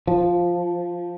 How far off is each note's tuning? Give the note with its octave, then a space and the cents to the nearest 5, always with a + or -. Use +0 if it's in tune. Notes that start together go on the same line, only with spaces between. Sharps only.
F3 +0